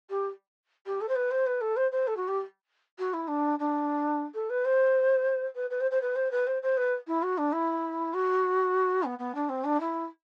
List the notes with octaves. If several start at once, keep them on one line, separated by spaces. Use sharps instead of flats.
G4
G4
A4
C5
B4
C5
B4
A4
C5
C5
A4
F#4
G4
F#4
E4
D4
D4
A4
B4
C5
B4
B4
C5
C5
B4
C5
B4
C5
C5
B4
E4
F#4
D4
E4
F#4
B3
B3
D4
C4
D4
E4